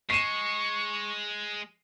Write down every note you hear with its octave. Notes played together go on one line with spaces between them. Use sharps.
G#3 C#6 C7 D#7 E7